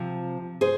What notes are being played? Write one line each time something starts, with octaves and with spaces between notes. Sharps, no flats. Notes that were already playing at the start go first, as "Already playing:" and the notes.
Already playing: C3 F3
G#4 C5